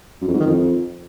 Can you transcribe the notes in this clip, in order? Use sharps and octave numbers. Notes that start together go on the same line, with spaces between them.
F#2
F2
G#2
D#3
F2